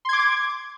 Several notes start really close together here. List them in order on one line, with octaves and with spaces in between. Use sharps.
C6 G#6 D6